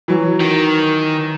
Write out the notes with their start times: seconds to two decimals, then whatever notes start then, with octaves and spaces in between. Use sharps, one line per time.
0.08 E3 F#3
0.40 D#3